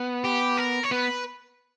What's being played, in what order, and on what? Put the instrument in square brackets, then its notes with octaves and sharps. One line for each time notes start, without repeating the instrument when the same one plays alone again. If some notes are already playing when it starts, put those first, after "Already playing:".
Already playing: [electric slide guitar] B3
[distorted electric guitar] G4
A#4
C#5
[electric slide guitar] B3 [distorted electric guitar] B4